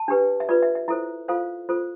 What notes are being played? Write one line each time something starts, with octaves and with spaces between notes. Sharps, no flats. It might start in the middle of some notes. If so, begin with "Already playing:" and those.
Already playing: A5
D4 G4 B4
E5
F4 B4 D5
E5
E5
E4 A4 C5 E5
F4 A4 C5 F5
F4 A4 C5